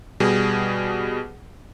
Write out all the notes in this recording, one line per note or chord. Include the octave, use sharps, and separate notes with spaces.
B2 G3 G#4